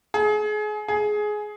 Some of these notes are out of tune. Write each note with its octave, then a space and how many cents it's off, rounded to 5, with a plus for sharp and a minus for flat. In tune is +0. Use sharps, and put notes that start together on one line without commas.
G#4 +30
G#4 +15